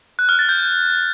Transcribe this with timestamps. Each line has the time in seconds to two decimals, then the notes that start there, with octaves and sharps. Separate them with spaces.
0.19 F#6
0.29 F6
0.39 A6
0.49 G6